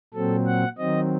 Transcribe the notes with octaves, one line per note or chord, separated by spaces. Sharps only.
A#2 F#3 C4 A4
F#5
D#3 F#3 C4 D#5